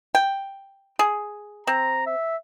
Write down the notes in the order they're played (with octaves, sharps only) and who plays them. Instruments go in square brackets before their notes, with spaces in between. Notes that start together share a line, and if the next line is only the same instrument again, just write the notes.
[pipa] G5
G#4
[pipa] C4 [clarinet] A#5
[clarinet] E5